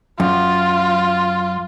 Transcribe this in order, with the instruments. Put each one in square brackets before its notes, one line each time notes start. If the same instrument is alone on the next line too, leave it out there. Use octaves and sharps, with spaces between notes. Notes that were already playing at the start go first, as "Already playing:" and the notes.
[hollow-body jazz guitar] F#2 [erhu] F4